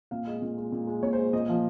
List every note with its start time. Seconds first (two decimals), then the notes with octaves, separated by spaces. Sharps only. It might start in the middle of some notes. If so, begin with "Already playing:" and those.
0.11 A#2 F5
0.27 G#3 D#5
0.42 A#2
0.58 G#3
0.72 A#2
0.87 G#3
1.03 A#2 C#5
1.13 G#3 C5
1.33 A#2 D#5
1.48 F3 A#3